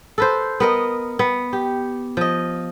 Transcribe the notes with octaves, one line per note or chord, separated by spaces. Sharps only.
A4 B4 C5
B3 A#4 D#5
B3
G4
F3 D#5